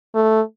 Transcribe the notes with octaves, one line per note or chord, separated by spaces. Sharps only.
A3